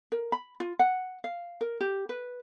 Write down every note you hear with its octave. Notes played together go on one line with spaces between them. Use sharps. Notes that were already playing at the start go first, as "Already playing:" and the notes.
A#4
B5
F4
F#5
F5
A#4
G4
B4